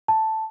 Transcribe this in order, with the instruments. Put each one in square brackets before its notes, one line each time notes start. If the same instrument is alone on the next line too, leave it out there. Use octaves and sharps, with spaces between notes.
[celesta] A5